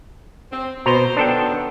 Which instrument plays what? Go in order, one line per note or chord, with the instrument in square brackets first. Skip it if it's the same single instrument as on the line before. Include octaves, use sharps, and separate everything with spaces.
[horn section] C4
[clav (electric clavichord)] B2 A#5 [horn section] C5
[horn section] D#3 F#3 B3 [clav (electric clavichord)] D4 A4 G5